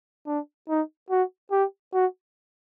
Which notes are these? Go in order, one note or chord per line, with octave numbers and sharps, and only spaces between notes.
D4
D#4
F#4
G4
F#4